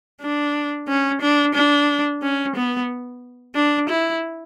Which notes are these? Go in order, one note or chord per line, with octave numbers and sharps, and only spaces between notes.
D4
C#4
D4
D4
C#4
B3
D4
E4